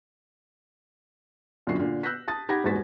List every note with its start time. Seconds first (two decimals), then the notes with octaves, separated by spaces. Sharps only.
1.67 B1 F#2 A#2 D3 F#4 C7
1.79 A#2 D3
2.03 E6 F#6 G6 A#6 B6
2.28 A5 D#6 A6
2.49 D#4 G4 F#5 B5 G#6 A#6
2.64 D#1 E2 G#2 F#4 A6 B6